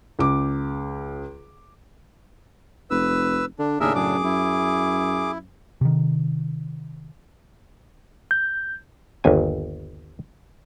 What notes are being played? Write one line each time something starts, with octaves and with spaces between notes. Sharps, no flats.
C#2 D6
F1 B4 E6
D3 D4
D#2 A2 C#3 D4 G#4 A#4 E5
F#2 G#4 D6
F#2 E4
C3 D#3
G6
G1 D#2 G#5